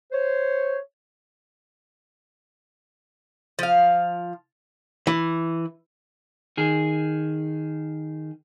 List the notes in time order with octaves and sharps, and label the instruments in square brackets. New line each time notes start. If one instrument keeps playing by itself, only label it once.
[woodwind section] C5 C#5
[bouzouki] F3 F5
[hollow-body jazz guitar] E3
[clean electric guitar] D#3 G#4